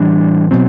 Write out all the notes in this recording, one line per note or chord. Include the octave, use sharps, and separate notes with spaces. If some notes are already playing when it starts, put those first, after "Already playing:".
Already playing: A2 E3 G3 D4
B2 F#3 C4